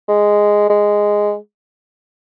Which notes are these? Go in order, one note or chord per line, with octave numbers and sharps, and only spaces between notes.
G#3
G#3